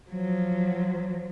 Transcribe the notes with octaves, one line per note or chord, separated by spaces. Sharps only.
F3 F#3